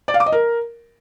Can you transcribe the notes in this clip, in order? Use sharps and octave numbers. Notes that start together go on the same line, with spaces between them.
D5
F5
D6
D#5
A#4